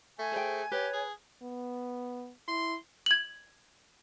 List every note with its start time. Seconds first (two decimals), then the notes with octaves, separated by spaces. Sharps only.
0.19 A3 G#5
0.32 G#4 C5 G5
0.71 G4 B4 C#5
0.93 G#4
1.43 B3
2.48 E4 C6
3.06 G#6 F#7